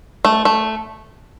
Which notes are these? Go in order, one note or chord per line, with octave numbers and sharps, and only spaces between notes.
A3
A3